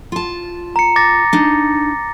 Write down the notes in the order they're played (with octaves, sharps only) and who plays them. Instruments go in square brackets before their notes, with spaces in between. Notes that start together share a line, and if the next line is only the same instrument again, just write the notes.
[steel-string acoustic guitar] F4 A5
[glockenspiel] A#5 C#7
D6 A6 A#6
[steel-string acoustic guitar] D4 D#4